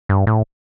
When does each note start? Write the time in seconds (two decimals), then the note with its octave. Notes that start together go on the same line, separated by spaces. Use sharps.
0.09 G2
0.27 A2